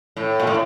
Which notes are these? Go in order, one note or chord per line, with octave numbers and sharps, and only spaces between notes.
A2
A#2
A2